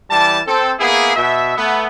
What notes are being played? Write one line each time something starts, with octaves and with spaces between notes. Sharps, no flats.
E3 G3 A5
C4 A4
A#3 B3 E4 G#4
B2 E5
A3 B3